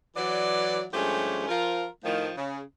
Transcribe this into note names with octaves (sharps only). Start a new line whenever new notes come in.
E3 F#3 D5
G2 F3 G#3 A3 C#4 G4
F3 F4 A#4
A2 D#3 F3
C#3